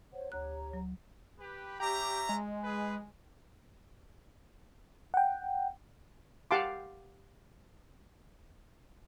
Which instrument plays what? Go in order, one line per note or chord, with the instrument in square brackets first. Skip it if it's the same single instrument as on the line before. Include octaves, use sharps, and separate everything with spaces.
[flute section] C5 C#5 F#5
[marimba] D2 F#6 [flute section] G4 C#5 A#5
[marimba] F#3
[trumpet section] G4 B4
[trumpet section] C#4 E5 A#5 [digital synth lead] G4
[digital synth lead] G#3
[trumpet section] G#4 B4
[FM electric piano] F#5 G5
[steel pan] G4 F5 F#5 A5 C6 D6